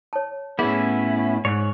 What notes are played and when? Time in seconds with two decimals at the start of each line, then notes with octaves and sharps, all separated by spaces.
0.13 C#5 A5
0.59 A2 B3 C#4 E4 G#4
1.45 G#2 C#5 F#6